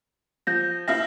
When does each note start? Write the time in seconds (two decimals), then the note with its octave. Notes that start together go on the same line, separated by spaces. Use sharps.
0.47 F3 G6 A#6
0.88 E4 E5 F5 A#6